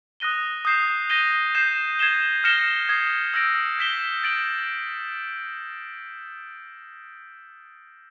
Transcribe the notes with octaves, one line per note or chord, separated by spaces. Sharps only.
D#6 F#6 A#6 D#7 G7
D#6 G6 C7 E7
G6 A#6 D#7 G7
G6 C7 E7
G#6 C7 E7 G7
F6 A#6 C#7 E7 G7
D#6 G#6 C7
E6 G6 A#6 D7
G6 B6 E7 G7
A6 D7 F#7